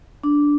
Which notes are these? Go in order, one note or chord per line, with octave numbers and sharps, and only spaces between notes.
D4